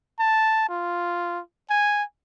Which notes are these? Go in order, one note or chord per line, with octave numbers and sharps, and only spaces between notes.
A5
F4
G#5